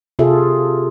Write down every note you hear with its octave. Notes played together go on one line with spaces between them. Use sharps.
C3 F4 G#4 A4 E5